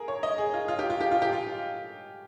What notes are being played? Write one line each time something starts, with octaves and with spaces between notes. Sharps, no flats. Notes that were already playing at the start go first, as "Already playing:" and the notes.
Already playing: G#4 A#4
C#5
D#5
G#4
F4
F4
G4
F4
G4
F4
G4
F4